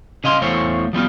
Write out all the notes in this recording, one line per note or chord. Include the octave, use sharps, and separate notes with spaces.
C#3 D#5 F5 C6
E2 E3 A3 C5 C#5 F5
F3 G3 B3 F4